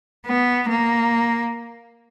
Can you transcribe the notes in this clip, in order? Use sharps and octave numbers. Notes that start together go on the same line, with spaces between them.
B3
A#3